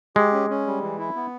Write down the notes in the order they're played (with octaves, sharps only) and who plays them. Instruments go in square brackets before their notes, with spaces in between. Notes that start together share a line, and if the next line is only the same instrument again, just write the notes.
[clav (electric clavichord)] G#3 [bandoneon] G4
[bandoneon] C#4
C#4
G3
E3
E4
B3